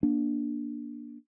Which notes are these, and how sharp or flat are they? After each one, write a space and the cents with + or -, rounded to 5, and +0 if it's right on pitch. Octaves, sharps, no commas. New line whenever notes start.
A#3 +30 D4 +0